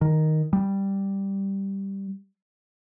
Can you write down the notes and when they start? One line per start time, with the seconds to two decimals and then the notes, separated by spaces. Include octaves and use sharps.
0.01 D#3
0.53 G3